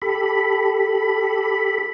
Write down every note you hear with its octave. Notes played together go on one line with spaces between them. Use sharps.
G4 A4 B5